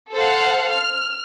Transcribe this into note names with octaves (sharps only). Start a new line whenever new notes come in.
A4 C5 F5 F#5
F6